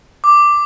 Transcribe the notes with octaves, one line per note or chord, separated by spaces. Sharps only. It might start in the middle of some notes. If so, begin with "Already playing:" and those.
D6